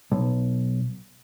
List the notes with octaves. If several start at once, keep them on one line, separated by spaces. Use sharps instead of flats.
B1